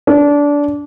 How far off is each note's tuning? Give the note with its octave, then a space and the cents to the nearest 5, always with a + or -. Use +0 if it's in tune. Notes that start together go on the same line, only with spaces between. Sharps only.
D4 -20